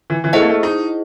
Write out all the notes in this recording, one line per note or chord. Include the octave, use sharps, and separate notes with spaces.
E3
E3
A3 E4 G#4 C5 D#5 F#5
A#3
A3
D#4